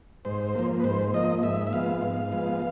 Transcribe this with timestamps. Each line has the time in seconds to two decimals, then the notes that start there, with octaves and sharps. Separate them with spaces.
0.25 G#2 C5
0.55 F3 A#3
0.80 B4
0.84 G#2 C5
1.14 F3 A#3 D#5
1.43 G#2 E5
1.67 E5
1.73 F3 G#3 B3 F5
2.02 G#2
2.32 F3 G#3 B3